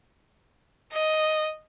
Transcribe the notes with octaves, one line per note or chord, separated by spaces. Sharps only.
D#5